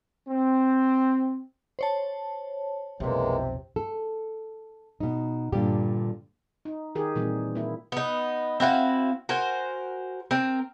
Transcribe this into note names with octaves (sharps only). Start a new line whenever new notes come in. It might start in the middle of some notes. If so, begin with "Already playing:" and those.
C4
C5 C#5 A5
B1 F2 C3 E3 G#3 A#3
A4
B2 D#4
G2 A#2 D3 G4
D#4
D#3 G4 G#4 A#4
A#2 D#3 E3 G3 C4
A#3 E4
B3 D#4
C4 E4 F#4 F5
F#4 A#4 C5 G#5
C4 A#4